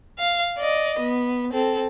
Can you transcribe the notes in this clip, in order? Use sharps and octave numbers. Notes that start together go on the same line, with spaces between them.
F5
D5 D#5
B3
C4 A4